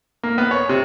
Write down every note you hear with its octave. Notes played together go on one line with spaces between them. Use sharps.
A#3
B3
C#5
C3